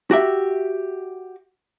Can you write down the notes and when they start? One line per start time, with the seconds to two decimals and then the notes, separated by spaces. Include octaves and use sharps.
0.11 F#4 G4 E5